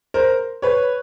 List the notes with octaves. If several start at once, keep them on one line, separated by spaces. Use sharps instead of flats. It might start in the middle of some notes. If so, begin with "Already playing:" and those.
A#4 C5
B4 C#5